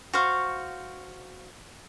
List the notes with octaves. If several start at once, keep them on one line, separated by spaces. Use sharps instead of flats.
F#4 C5 F5 C#6